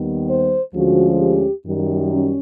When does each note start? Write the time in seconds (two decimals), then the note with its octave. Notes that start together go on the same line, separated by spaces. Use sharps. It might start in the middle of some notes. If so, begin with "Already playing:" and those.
Already playing: D#2 D#3 G3 B3
0.29 C5
0.74 D2 D3 F3 G#3 C#4 F#4
1.19 G4
1.65 F#2 D#3 G3
2.10 C#4